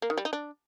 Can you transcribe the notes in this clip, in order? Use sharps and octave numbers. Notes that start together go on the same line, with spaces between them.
A#3
D#3
G3
D#4
D4